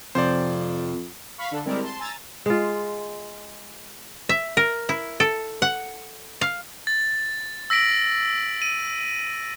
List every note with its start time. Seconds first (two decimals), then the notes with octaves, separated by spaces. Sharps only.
0.15 F2 C3 F3 C5 D5
1.38 F5 B5 C#6 B6
1.51 D3 D4 A4
1.65 G3 G#3 C4 E4 A#4 D5
1.82 A5 C6
1.99 G#5 A#5 E6 A6
2.46 G#3 F4
4.29 E5
4.57 A#4
4.89 E4
5.20 A4
5.62 F#5
6.41 F5
6.87 A6
7.70 E6 A#6 B6 D7 F#7
8.62 D#7